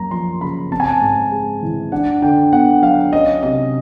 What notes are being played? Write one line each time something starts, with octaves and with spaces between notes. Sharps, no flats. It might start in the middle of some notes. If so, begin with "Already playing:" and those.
Already playing: F#2 A#3 A#5
F3 C6
C#3 B5
C4 A5
G#5
A5
G#2
G#3
E3
D4 F#5
D3 G5
B3 F#5
F#3 F5
C#4 D#5
C3 D#5